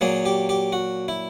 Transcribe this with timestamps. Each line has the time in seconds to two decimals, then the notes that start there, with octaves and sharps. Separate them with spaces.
0.01 A#2 F#3 A#3 G#4
0.26 G4
0.49 G4
0.72 F#4
1.08 E4